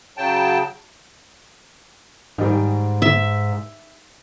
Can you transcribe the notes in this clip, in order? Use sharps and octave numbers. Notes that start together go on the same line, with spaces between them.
C#3 F#3 G5 A5
G#2 D#3 G3
E5